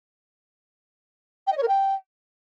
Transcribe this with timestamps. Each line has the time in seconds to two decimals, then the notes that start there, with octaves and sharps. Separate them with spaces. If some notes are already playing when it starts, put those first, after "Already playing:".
1.47 G5
1.52 D#5
1.57 C#5
1.63 A#4
1.68 G5